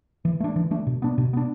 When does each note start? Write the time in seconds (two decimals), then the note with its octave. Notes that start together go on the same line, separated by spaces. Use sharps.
0.25 E3
0.40 A3 D4
0.56 E3
0.71 A3 D4
0.87 B2
1.02 B3 D4
1.18 B2
1.33 B3 D4